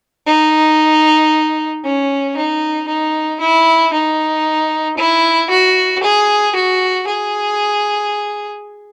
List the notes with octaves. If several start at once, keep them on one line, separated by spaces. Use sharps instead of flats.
D#4
C#4
D#4
D#4
E4
D#4
E4
F#4
G#4
F#4
G#4